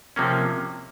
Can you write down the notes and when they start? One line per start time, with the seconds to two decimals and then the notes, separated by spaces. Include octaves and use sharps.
0.16 C3 F3 A#3 C#4